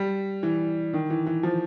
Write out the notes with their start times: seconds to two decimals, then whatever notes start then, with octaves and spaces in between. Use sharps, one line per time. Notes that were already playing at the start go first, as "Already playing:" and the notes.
Already playing: G3
0.43 E3
0.94 D#3
1.10 E3
1.27 E3
1.43 F3